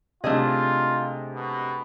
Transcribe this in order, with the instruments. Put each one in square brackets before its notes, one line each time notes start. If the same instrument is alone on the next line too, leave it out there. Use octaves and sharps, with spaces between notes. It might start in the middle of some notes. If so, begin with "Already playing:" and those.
[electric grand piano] C3 [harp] A3 D4 G#4 [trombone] F4 [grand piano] D#5
[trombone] B2